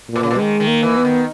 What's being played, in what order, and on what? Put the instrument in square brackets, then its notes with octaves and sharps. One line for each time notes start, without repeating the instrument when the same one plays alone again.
[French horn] A#2
[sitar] B2
C#3
B2
[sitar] D#3 [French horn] G#3
[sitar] D#3
[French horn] A#3
[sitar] E3
[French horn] B3
[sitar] D#3